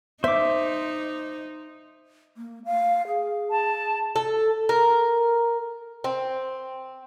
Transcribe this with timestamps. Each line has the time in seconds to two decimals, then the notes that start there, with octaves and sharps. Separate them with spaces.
0.24 D#4 C5 E5 D6
2.37 A#3
2.65 F5
3.08 G#4
3.50 A5
4.16 A4
4.69 A#4
6.04 C4